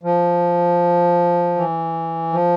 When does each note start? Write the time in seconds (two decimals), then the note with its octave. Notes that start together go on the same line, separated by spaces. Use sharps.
0.03 F3
1.56 E3
2.33 F3